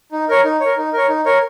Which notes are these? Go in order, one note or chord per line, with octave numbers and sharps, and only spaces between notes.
D#4
A#4 C#5
D#4
A#4 C#5
D#4
A#4 C#5
D#4
A#4 C#5